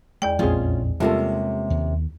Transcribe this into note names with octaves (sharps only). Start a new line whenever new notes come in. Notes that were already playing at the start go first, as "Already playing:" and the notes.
E2 G#3 D5 G5
A#1 F2 G#3 C4 C#4 F4 G#4
C3 G3 G#3 A#3 C#4 F4 A4
D#2